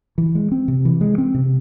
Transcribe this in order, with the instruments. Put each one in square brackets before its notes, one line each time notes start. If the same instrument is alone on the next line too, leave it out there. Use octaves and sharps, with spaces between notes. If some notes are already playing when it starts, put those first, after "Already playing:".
[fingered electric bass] E3
G#3
C4
C3
E3
G#3
C4
C3